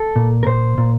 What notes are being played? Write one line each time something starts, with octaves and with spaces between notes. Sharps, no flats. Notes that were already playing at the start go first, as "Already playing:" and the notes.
Already playing: A4
A#2
A#4
A#2 C5
A#2